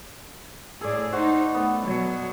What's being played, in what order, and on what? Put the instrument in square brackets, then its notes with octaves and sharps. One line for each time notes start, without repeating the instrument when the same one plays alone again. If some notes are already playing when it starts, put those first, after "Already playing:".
[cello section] A2 G#4 [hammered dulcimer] A4 D5
[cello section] D#4 C5 [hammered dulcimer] F#4
[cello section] A3 [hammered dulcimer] B3
[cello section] B2 F#3